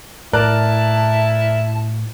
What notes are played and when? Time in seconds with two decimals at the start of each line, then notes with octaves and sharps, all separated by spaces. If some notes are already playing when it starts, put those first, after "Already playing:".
0.33 A2 E4 A#4 D5 A5 F#6